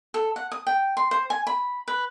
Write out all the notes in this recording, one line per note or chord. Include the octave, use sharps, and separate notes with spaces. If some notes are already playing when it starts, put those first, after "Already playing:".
A4
F#5
D#6
G5
C6
C5
G#5
B5
B4